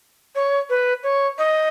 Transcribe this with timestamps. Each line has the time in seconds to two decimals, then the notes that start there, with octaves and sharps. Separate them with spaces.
0.35 C#5
0.70 B4
1.03 C#5
1.38 D#5